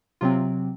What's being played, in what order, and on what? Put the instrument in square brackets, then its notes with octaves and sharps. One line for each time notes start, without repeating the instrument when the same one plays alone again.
[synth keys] C3 F#3 C4 F4